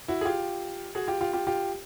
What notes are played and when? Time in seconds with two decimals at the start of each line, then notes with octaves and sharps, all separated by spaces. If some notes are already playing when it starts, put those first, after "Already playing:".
0.08 E4 F#4
0.21 G#4
0.25 F4 G4
0.95 F#4 G#4
1.08 F4 G4
1.21 F4 G4
1.33 F4 G4
1.47 F4 G4